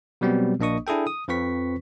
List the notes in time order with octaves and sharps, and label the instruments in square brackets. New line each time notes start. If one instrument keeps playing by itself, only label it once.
[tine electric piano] B2 F#3 G3 B3 C4
A#1 A#3 D4 D#5 C#6 D#6
D4 E4 G#4 A4 G5
D#6
F2 F3 C4 B4 C#6 B6